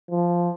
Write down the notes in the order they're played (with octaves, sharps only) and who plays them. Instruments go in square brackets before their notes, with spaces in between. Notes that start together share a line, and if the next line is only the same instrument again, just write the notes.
[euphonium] F3